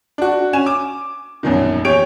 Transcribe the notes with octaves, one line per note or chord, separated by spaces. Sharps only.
D4 F#4
C#4 G#5 E7
D6
A#1 F#2 B2 D#3
E2 G4 C#5 G5 D7 F7